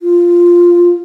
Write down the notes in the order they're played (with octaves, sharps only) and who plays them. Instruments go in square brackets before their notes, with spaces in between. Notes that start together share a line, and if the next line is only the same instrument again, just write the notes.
[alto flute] F4